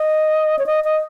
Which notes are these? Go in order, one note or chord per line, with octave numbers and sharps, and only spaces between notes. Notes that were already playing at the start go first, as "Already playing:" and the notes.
Already playing: D#5
C#5
D#5
D#5